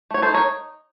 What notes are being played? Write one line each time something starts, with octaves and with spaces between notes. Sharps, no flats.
A3 C#5
A4 C5
D#4
A#4 C#5